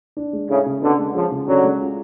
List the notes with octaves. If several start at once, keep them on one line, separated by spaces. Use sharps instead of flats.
D4
G#3
A2 C#3 G#4
C#3
B2 D3 D4
G#3
C#3 F3 G#4
C#3
D3 F#3 C#4
G#3
F4